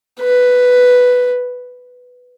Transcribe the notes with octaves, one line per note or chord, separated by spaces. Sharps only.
B4